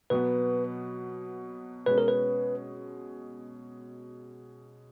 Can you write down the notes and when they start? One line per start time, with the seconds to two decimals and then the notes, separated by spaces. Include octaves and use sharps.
0.10 B2 F#3 B3 B4
1.86 B2 G#3 C#4 B4
1.98 A#4
2.08 B4